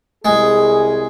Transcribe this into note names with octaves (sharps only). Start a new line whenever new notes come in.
C2 G#3 G#4